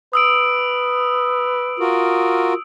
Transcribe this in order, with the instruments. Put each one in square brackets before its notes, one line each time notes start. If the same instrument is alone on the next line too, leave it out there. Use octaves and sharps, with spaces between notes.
[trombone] B4 [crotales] D#6 E6 D7
[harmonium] F4 F#4 A#4